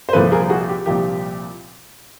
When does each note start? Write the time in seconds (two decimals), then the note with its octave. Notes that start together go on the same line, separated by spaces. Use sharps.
0.09 C5
0.13 C2 A#2 F3 A#3 A4 B4
0.32 G#4 A#4
0.49 F#4 G#4
0.68 G4
0.86 C2 A#2 F3 A#3 G4